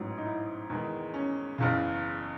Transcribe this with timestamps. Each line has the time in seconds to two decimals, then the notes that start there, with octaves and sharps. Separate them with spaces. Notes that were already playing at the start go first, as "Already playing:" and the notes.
Already playing: A1 G#2 F#3
0.18 D#4
0.25 E4
0.70 E2 D#3 G#3
1.14 C#4
1.58 F#1 E2 C#3